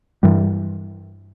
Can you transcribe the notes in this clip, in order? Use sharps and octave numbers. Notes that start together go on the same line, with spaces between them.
G2 E3 G3